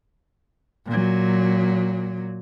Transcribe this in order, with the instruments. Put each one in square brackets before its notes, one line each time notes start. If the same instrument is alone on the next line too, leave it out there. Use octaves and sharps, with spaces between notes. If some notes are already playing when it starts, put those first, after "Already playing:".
[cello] A#2 F#3